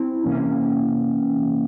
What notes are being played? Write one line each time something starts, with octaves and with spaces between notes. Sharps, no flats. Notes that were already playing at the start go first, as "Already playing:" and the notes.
Already playing: C4 E4
C3 E3 A#3 C#4